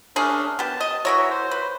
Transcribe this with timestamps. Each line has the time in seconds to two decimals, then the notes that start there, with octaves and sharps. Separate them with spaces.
0.16 A3 C#4 D4 G#4 A#4
0.59 B3 G4 A5
0.81 D#5
1.05 E3 F#4 A#4 C#5 E5
1.30 C5
1.51 B4